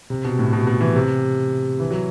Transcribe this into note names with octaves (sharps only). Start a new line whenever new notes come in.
C3
B2
A2
B2
B2
E3
C3
E3
F#3